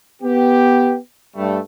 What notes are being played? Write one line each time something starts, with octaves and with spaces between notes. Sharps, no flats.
B3 G4
G2 G3 A3